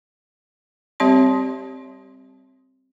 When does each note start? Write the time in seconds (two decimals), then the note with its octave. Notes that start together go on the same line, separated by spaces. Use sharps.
1.00 G3 C4 G4 C#5 E5 C6